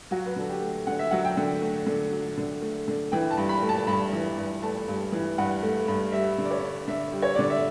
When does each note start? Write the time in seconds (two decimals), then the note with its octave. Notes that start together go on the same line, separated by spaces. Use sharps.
0.11 F#3 F#4
0.26 B4
0.36 D3 A4
0.49 G4
0.61 A3
0.87 D3 F#5
0.99 E5
1.11 F#3 F#5
1.25 G5
1.37 D3
1.61 A3
1.86 D3
2.12 F#3
2.37 D3
2.62 A3
2.88 D3
3.12 E3 G5
3.31 A5
3.37 G2
3.49 B5
3.62 A3
3.69 A5
3.87 G2 B5
4.13 E3
4.37 G2
4.63 A3 A5
4.88 G2
5.12 E3
5.38 G2 F#5
5.62 A3
5.88 G2
6.12 G3 E5
6.38 D3
6.45 D5
6.51 C#5
6.62 D4
6.88 D3 E5
7.13 G3
7.22 C#5
7.35 D3 D5
7.50 E5